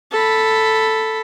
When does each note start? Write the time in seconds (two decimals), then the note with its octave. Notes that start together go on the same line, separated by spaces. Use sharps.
0.12 A4 B5